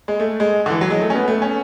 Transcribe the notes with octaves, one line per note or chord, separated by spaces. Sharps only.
G#3
A3
G#3
D3
E3
F#3
G#3
A3
C#4
B3
A3
C#4